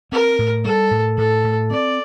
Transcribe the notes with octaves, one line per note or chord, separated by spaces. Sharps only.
C4 A#4
A2
G3 A4
A2
A2 A4
A2
C4 D5